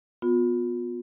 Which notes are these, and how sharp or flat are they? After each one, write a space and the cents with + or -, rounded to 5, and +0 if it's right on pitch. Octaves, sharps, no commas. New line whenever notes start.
B3 +0 F4 +35